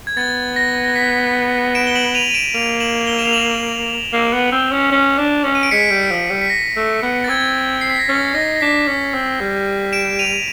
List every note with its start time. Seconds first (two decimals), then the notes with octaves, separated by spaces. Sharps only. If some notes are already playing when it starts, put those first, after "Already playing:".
0.07 G#6
0.17 B3 A6
0.56 A#6
0.84 A#6
0.96 B6
1.75 D7 E7
1.87 G7
1.95 E7 F#7
2.15 D#7 F7
2.30 D#7
2.34 D7 E7
2.54 A#3 D#7 F7
2.80 E7 F#7
3.07 F7 G7
3.19 E7
3.25 F7
3.33 E7 F#7
4.13 A#3
4.33 B3
4.52 C4
4.72 C#4
4.91 C#4
5.18 D4
5.44 C#4
5.55 D#7
5.63 D7
5.71 G#3 B6 C#7
5.91 G3
6.11 F3
6.30 G3
6.41 B6
6.50 A#6
6.76 A3
7.02 B3
7.24 A6
7.29 C4 G#6
7.81 C7
7.90 B6
7.99 A#6
8.08 C#4 A6
8.34 D#4 A#6
8.56 A#6
8.61 D4 B6
8.87 C#4
9.14 C4
9.40 G3
9.93 D7 E7
10.19 D#7 F7